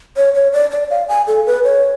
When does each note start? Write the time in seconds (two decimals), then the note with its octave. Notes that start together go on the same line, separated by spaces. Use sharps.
0.17 C#5
0.34 C#5
0.53 D5
0.71 D5
0.90 F5
1.09 G#5
1.27 A4
1.46 B4
1.64 C#5